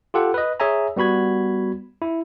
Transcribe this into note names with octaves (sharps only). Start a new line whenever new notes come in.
F4 G4 A4 F#5
B4 D#5
G#4 C#5 E5 G#5 A#5
G3 B3 F#4 B5 G#6
E4